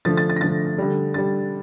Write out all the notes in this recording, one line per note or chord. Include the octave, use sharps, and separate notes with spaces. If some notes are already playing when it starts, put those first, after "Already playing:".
D3 F3 A3 A6
A6
A6
A#6
D3 F3 A3 A6
D3 G3
D3 G3 A6